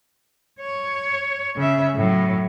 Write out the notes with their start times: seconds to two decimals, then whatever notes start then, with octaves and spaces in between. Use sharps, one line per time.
0.60 C#5
1.56 C#3 E5
1.95 A2 F#3